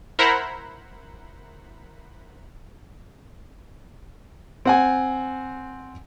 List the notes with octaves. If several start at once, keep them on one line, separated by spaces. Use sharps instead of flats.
E4 A#4 C5 F#5 A#5 B5
C4 F#5 G#5